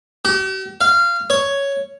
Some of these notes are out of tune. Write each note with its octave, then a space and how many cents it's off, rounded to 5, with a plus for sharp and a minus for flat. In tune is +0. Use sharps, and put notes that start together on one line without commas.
G4 -45
F5 -20
C#5 +5